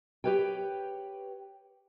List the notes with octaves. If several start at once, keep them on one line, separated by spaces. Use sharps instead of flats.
G4 A#4 B4 C#5 G5